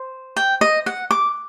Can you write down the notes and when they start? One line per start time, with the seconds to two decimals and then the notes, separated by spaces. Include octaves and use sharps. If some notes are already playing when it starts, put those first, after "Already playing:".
Already playing: C5
0.36 G5
0.61 D#5
0.86 F#5
1.11 D6